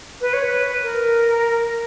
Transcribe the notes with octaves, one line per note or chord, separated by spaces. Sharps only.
B4
C#5
B4
A#4